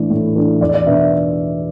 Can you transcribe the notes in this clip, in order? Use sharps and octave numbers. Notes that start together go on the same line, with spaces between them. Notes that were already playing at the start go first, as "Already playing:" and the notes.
Already playing: A2 E3 A3 D4
A2
E3 A3 D4
E2 D5
D5
B2 B3 D4 E5
E5